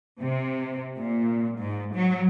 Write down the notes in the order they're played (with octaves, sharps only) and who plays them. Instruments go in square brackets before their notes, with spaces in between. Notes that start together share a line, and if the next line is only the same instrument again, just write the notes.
[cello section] C3
A#2
G#2
F#3